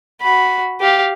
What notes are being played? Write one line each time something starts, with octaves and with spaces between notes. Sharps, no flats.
F#4 B5
G4 F5